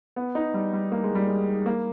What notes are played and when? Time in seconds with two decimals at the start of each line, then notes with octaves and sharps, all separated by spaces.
0.16 B3
0.35 D#4
0.54 G3
0.73 G3
0.92 A#3
1.04 G#3
1.15 G3
1.28 G#3
1.66 A#3